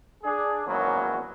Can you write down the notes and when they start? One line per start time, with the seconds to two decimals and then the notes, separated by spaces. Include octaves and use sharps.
0.24 D4 G#4
0.66 G#1 E2 F#3 A#3 B3 C#4